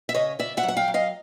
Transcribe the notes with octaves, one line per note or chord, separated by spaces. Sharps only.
E5
C#3 C#5 D#5
C#3 D5 E5
E5 F#5
F#3
F#5
F5 G5
F#3
D#5 F5